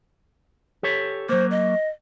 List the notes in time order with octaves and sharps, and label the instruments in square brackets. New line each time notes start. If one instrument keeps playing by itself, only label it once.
[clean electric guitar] G4 A4 C#5
[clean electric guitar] F#3 A#3 [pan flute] C5
[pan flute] D#5